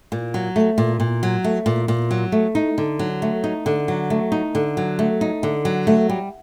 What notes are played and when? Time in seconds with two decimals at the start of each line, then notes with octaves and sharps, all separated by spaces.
0.12 A#2
0.34 F#3
0.56 A3
0.78 A#2
1.00 A#2
1.23 F#3
1.44 A3
1.66 A#2
1.88 A#2
2.11 F#3
2.32 A3
2.55 D#4
2.78 D3
2.99 F#3
3.22 A3
3.44 D#4
3.66 D3
3.88 F#3
4.10 A3
4.32 D#4
4.55 D3
4.77 F#3
4.99 A3
5.21 D#4
5.43 D3
5.65 F#3
5.87 A3
6.09 G3